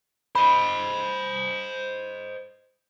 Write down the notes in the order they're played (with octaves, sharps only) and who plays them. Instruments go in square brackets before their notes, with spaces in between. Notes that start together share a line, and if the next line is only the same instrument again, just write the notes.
[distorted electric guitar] C5 D#5 [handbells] B5